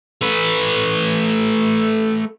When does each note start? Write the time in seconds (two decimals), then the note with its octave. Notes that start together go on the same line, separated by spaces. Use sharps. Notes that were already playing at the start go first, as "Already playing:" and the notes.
0.22 A3 B4